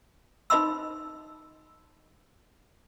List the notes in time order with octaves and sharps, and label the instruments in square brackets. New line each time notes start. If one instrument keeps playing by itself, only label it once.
[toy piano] D#4 C5 D#5 B5 C6 E6